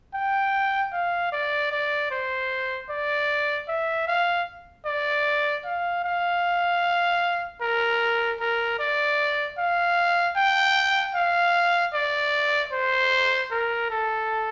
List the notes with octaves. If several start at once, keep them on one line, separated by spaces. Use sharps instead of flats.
G5
F5
D5
D5
C5
D5
E5
F5
D5
F5
F5
A#4
A#4
D5
F5
G5
F5
D5
C5
A#4
A4